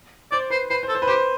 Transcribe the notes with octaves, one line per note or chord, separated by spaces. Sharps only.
C5 D5
B4 C5
B4 C5
C5
A4
C5
B4
G4 C5